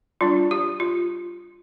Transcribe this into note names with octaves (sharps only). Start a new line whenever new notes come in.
G3 D4 F4
G4
F4